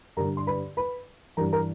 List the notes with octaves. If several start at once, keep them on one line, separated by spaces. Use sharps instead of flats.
G2 D3 A#4 A#5
C6
B4 B5
B4 B5
G2 E3 A#4 A#5
A#4 A#5